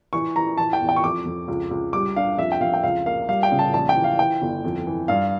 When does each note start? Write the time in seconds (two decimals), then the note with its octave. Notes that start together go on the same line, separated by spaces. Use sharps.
0.13 E3 C#6
0.36 E3 A#5
0.58 E3 A5
0.73 G5
0.81 E2
0.89 G5
0.96 C#6
1.04 F2 D6
1.26 F2
1.48 C#2
1.71 C#2
1.93 G3 D6
2.16 D4 F5
2.38 F2 E5
2.52 G5
2.61 F2 F5
2.74 G5
2.83 C#2 F5
3.06 A#3 F5
3.28 G3 F5
3.43 G5
3.52 C#3
3.59 A5
3.74 A#1 A5
3.89 G5
3.96 E3
4.04 F5
4.19 E3 G5
4.42 G1
4.64 F2
4.87 E3
5.08 G2 F5